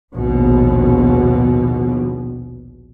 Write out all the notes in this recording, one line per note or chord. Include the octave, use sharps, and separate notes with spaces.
A#1 D#2 B2